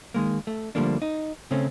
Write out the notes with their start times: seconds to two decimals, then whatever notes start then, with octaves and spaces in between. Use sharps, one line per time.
0.14 D#3 G#3 A#3
0.47 A3
0.75 D3 F3 G3 A3 A#3 D4
1.02 D#4
1.51 C#3 A3 C4 C#4